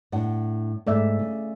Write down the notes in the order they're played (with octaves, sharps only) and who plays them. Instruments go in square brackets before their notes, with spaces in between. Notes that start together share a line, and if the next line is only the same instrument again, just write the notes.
[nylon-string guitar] A2 D4 F#5
[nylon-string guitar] G#2 [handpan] A3 D5 E5
[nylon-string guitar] C#3